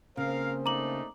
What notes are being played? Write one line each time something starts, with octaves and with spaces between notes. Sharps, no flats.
C#3 A#3 C4 A#4 C5 F5
A3 D4 D#4 A#5 D6 F#7